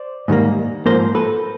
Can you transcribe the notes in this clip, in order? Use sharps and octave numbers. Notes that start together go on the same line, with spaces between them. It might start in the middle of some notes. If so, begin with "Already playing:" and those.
Already playing: C5 D5
G#2 D#3 G3 A#3
G#2 F3 A#3 A#4 C5
A4 B4